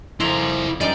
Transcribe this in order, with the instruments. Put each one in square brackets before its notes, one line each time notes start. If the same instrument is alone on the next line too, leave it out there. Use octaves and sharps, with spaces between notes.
[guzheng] F2 A#5 C6 [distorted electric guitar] E4 C5
[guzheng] F#2 G3 D#4 [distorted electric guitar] D5